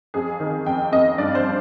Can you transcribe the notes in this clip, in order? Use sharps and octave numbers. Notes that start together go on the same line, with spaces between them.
F2 G#4
D#3
F2 G5
F2 D#5
G2 D5
C5
D4